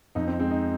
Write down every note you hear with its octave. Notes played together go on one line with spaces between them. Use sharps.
F2 D#4
C4
G#3 C4
D#4